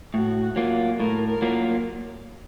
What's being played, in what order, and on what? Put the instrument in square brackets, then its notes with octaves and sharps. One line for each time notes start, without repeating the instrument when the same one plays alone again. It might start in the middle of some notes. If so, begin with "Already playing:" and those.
[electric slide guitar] A2 [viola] F#4
[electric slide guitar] F#3 A#3 F4
[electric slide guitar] A2 [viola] A#4
[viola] A#4
[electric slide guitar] F#3 A#3 F4